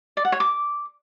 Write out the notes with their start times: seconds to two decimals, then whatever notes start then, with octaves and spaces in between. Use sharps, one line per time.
0.17 D5
0.25 F#5
0.32 C#5
0.40 D6